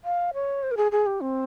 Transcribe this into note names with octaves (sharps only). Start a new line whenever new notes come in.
F5
C#5
C5
A#4
G#4
G#4
G4
C4